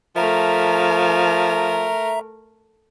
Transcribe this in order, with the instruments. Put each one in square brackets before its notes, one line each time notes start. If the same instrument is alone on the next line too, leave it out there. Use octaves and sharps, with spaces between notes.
[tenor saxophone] F3 [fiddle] A3 A#4 [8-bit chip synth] E5 A#5